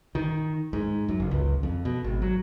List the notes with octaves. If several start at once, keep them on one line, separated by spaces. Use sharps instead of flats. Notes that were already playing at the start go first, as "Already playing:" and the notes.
D#3
G#2
F#2
F#1
C#2
F2
B2
G#1
F#3